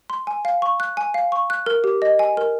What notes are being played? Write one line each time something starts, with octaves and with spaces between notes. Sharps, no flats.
C6
G#5
F5
C#6
F#6
G#5
F5
C#6
F#6
A#4
G4
D#5
G#5
A#4